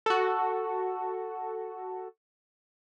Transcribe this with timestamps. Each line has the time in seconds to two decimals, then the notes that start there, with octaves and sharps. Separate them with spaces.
0.06 F#4 A4